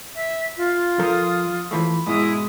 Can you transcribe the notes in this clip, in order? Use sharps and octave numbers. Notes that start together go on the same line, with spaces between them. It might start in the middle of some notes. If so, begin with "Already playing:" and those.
E5
F4
F3 A4 A#4 D#6
E3 F3 A3 B5
G#2 B2 G#3 E4 D#6